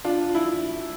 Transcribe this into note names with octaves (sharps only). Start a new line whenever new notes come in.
D4 F4
E4